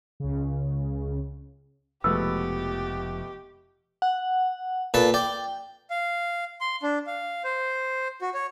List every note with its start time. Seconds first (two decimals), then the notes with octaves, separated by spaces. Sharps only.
0.20 C#2 C#3
2.04 F1 B2 F3 G#3 A3 B3 G4 E6
4.02 F#5
4.94 A#2 A4 B4 A5
5.14 D5 G5
5.90 F5
6.61 C6
6.83 D4
7.07 F5
7.44 C5
8.22 F#4
8.34 C#5